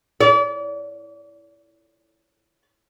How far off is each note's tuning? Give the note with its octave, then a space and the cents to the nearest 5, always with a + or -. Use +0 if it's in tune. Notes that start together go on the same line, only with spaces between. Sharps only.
D5 -35